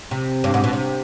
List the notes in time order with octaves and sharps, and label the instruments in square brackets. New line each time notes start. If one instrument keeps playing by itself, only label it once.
[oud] C3
G2
G#2
B2
C3